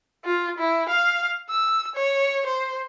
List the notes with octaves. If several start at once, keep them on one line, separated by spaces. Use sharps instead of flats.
F4
E4
F5
E6
C#5
C5